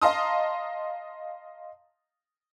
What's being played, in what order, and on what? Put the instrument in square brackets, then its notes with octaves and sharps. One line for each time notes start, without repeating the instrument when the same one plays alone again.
[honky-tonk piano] D#5 F5 A5 A#5 C6 D#6